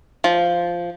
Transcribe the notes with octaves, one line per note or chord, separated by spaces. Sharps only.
F3